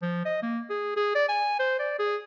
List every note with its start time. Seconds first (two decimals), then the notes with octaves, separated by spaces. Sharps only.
0.02 F3
0.25 D#5
0.42 A#3
0.70 G#4
0.96 G#4
1.15 D5
1.29 G#5
1.59 C5
1.79 D5
1.99 G#4